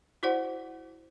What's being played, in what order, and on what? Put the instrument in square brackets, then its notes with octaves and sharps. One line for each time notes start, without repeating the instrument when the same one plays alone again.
[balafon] E4 F#4 C5 D5 F#5